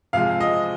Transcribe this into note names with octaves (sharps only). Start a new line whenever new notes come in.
C3 F3 G#3 F5
D#5